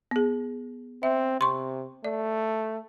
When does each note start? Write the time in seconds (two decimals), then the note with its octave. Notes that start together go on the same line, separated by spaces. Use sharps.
0.11 B3 G#4
1.03 C4 E5
1.41 C3 C6 C#6
2.04 A3 D5